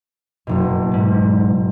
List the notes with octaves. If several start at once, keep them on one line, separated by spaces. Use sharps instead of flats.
F#1 B2
G#2